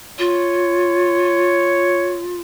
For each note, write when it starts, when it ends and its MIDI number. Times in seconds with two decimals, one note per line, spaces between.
0.19 2.41 65
0.19 2.22 73